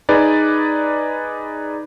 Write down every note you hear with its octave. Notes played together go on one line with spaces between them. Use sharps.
D#4 G#4 B4 D5